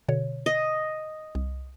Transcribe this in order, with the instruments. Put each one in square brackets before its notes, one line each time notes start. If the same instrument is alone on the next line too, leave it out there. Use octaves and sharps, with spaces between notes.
[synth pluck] B2 D3 C#5
[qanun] D#5
[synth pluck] C2